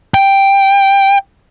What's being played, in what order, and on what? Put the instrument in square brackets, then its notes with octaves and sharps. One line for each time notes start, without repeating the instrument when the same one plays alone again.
[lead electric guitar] G5